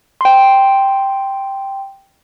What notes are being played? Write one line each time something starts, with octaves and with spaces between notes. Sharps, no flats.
G5 C6